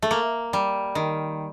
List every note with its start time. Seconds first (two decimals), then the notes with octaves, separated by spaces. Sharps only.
0.02 A3
0.11 A#3
0.53 G3
0.95 D#3